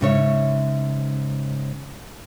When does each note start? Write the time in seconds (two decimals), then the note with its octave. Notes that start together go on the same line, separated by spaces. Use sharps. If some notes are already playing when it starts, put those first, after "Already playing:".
0.01 G#2 C#3 C#5 E5